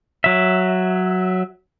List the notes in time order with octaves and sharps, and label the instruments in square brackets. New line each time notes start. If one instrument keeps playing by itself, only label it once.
[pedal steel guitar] F#3 E5